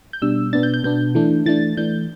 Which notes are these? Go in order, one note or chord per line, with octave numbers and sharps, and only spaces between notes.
G6
B2 G3 D4 E6
B2 B3 D4 A6
G6
G6
B2 B3 D4 G6
E3 A3 D4
E3 A3 D4 A6
E3 A3 D4 G6